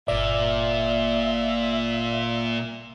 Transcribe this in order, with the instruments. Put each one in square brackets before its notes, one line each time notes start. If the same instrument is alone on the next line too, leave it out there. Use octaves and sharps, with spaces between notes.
[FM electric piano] G1 D5 [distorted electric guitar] A#2 [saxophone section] E5